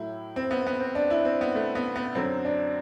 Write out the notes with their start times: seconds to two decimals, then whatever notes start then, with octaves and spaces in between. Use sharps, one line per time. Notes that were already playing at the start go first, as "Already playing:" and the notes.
Already playing: A2 F#3 E4
0.36 C4
0.51 B3
0.67 B3
0.80 C4
0.95 D4
1.10 E4
1.25 C4
1.41 B3
1.55 A3
1.75 B3
1.96 B3
2.15 F#2 D3 F#3 C4
2.45 D4